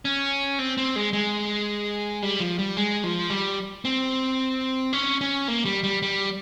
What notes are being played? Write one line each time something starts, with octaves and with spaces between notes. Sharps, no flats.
C#4
C4
C4
G#3
G#3
G3
F3
G3
G#3
F3
G3
C4
C#4
C#4
A#3
G3
G3
G3